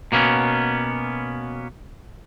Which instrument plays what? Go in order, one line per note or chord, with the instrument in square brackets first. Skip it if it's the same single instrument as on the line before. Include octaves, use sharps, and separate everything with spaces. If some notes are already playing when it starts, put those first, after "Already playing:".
[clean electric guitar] B2 A#3 B3 C#4